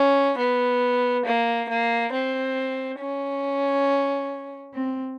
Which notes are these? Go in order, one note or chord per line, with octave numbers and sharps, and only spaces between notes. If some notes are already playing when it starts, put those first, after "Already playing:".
Already playing: C#4
B3
A#3
A#3
C4
C#4
C4